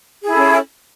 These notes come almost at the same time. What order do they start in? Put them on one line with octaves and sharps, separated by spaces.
G#4 E4 A4 C#4